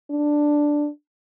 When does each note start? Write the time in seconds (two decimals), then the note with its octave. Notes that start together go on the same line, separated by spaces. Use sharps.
0.10 D4